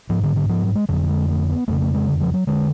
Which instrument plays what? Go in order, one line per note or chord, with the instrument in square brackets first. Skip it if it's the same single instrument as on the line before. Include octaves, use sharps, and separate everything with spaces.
[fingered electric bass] G#2 F3
D3
D3
F3
F#3
G#3
F2 D3 F#3
G#3
A3
B3
F2 C#3 A3
A3
G#3
D3
F3
F#3
D3 G#3